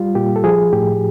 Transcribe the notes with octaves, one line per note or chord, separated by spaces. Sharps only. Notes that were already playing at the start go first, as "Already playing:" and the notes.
Already playing: G3 F4
A#2 G4
A4
F3 G#4
A2 G4